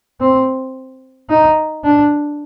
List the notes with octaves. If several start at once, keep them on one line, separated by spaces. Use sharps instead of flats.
C4
D#4
D4